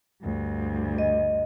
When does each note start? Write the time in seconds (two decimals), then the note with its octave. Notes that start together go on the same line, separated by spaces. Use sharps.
0.23 D2 G2
0.98 D#5